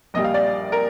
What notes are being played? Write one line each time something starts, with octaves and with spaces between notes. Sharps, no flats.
A#1 A#2 G3 D#5
F5
D5
A#4